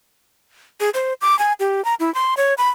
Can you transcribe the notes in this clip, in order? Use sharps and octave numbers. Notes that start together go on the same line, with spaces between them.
G#4
C5
D6
G#5
G4
A#5
E4
C6
C#5
B5